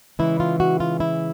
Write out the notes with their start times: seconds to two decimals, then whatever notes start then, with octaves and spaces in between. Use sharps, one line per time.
0.19 C#3 E3 G#3 E4
0.40 F4
0.60 F#4
0.80 F4
1.00 E4